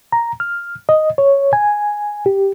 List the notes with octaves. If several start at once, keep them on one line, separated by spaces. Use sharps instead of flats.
A#5
F6
D#5
C#5
G#5
G4